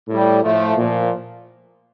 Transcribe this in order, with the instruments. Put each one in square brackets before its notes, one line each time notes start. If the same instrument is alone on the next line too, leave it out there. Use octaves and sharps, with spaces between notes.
[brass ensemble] A2 G3
A2 F3 A3
A#2 F3